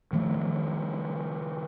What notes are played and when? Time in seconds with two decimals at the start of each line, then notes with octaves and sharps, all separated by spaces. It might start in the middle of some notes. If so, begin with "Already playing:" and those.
0.13 D#3 F3 A3